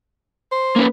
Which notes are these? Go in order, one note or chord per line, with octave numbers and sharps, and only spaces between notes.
C5
A#3 C#4 B4